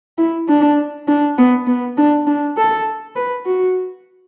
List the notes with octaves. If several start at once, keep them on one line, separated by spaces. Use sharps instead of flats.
E4
D4
D4
B3
B3
D4
D4
A4
B4
F#4